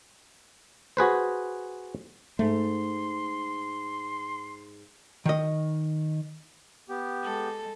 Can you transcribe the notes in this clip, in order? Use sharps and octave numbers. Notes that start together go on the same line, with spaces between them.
F#4 G#4 B4 C5
G#2 A3 C6
D#3 D#5
B3 G4
G#3 A4